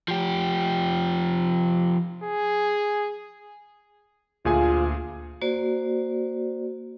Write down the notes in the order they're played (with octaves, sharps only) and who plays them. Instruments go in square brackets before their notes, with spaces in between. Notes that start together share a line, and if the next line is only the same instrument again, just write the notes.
[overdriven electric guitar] F3 G4
[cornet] G#4
[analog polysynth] D2 [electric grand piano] A#2 G#4 G#5 [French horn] F4
[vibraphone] A#3 F#4 C5 D5